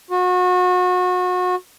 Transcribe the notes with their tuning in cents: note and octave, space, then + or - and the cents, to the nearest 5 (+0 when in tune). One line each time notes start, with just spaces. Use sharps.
F#4 -30